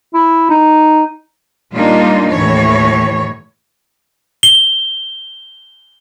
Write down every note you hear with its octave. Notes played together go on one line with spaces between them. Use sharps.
E4
D#4
A#2 G3 A#3 D4 D#4 F4
D#2 A2 E3 C#5
G7